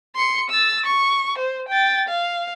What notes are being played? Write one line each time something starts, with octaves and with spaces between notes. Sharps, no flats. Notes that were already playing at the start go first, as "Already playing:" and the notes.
C6 C#7
E6 A6
C#6
C5
G5 A6
F5